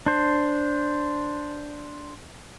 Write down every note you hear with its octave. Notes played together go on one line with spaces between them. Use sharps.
D4 C5